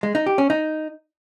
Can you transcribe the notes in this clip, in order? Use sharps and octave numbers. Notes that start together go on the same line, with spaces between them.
G#3
D#4
G4
C#4
D#4